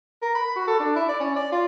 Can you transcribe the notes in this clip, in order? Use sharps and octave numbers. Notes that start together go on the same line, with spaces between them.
A#4
B5
F#4
A4
D4
E4
D5
C#4
D5
F4